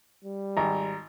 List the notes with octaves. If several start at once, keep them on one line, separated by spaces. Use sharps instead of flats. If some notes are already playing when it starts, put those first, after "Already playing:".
G3
G#1 A#5